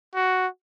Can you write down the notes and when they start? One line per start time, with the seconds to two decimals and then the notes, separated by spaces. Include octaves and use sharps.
0.15 F#4